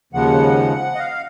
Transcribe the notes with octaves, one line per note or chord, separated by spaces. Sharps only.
D#2 C#3 F3 G#3 F#5
D#5
F5